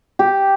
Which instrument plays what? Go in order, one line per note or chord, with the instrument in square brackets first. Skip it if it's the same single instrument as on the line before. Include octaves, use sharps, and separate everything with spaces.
[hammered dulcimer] G4